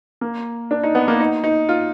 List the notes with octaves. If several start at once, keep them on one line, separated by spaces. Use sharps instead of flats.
A#3
D4
D#4
B3
A#3
D#4
D#4
F4